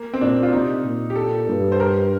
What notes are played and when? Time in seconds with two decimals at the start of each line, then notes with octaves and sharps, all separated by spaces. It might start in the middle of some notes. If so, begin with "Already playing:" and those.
Already playing: A#3
0.14 C4
0.21 A#2 D4
0.43 F4
0.53 C3 D#4
0.85 A#2
1.10 G4
1.16 A4
1.48 G2
1.72 C5
1.80 A#4